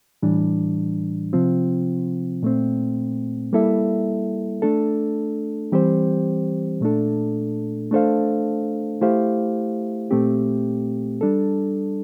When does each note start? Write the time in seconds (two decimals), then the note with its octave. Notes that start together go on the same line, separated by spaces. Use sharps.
0.23 A2 E3 G3 D4
1.33 C3 F3 C4 F4
2.43 A#2 A3 C4
3.53 G3 A#3 E4 A4 E5
4.62 A3 D4 A4
5.72 E3 G3 C4 G4 C5
6.81 A#2 A3 D4 A4
7.91 A3 D4 A4 C5 F5
9.01 A3 E4 G4 C5 F5
10.11 A#2 A3 C4 G4
11.21 G3 D4 A4